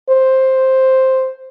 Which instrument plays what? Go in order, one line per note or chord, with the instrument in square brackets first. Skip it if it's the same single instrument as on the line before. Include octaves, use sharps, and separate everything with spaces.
[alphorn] C5